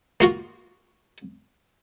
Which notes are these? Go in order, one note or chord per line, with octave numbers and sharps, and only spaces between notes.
A#3 F4 F#4